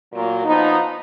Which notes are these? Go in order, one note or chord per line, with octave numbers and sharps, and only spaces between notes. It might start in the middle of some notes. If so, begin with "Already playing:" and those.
A#2 F#3 A#3
F3 B3 D#4